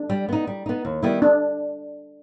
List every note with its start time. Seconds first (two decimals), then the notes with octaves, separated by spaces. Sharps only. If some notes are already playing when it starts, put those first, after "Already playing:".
Already playing: D4
0.10 G3
0.29 B3 D#4
0.47 G3
0.66 B3 D#4
0.85 D#2
1.03 D#3 G3 B3 E4
1.22 D4